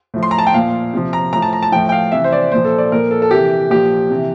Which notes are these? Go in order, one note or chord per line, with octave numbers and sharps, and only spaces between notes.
A2 F3
C6
A#5
A5
G5
A#2 F3 F5
C3 F3
A#5
A2 F3 A#5
A5
A#5
A5
A2 F3 G5
G5
F5
C3 E3 E5
C5
D5
A#2 F3 C5
A4
D5
A#2 F3 A#4
A4
A4
C3 E3 G4
A#2 F3 G4
C3 E3